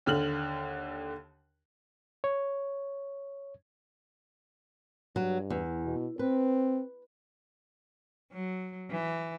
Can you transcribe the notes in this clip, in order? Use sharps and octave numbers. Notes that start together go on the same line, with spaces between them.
D#2 D3 F6 F#7
C#5
G2 F#3
E2
B2
C4 B4
F#3
E3